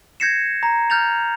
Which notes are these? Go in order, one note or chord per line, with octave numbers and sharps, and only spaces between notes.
G6 G#6 A#6 C7 C#7 E7
A#5
F6 G6 A6 F7